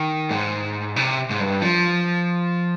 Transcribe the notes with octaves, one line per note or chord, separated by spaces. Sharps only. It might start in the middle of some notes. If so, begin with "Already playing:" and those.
Already playing: D#3
G#2
C3
G#2
G2
F3